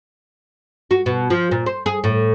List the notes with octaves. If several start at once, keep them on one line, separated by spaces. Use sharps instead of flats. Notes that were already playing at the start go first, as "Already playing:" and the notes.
F#4
B2
F3
A#2
C5
G#4
A2